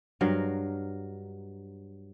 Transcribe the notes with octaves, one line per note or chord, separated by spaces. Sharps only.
G2 F#3 A#4 F5